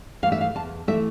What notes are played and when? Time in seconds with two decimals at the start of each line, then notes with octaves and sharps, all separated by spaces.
0.22 E3 A3 F5
0.32 E5
0.41 F5
0.55 E2 A5
0.88 E3 A3 E5